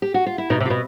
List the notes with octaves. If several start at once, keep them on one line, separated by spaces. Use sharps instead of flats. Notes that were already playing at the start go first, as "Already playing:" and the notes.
G4
F#4
F4
E4
B2 D#4
C3
F4
B2